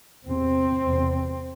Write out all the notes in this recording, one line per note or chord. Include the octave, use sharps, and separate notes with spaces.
E2 C3 C4
E2 C3